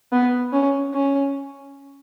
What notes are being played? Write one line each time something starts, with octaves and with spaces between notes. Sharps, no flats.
B3
C#4
C#4